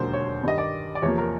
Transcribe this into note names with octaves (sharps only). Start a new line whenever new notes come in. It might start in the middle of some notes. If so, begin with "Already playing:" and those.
Already playing: E1 D#2 D3 F#3 A#3 C5
C#5
G2 D#3 G3 D#5
D5
D5
E2 C3 F3 A#3 C#5
A#4